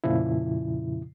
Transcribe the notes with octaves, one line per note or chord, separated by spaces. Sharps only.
F2 A#2 C#3 F3 E4